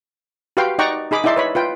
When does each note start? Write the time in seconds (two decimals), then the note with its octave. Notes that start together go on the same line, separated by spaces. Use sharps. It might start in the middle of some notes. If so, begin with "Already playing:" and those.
0.57 F#4 G4 B4 F5 G5 C6
0.79 D#4 D5 F#5 G5 A#5 C#6
1.11 D#4 G#4 B5 D6
1.24 D#4 E4 D5 E5 C6
1.36 B4 C#5 B5
1.55 F4 B4 G5